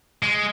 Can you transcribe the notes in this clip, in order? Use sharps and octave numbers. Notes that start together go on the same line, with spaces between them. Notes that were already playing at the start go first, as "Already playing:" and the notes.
G#3